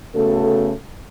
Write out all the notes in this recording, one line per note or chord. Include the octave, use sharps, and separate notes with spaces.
C#3 A3 B3 F#4 A4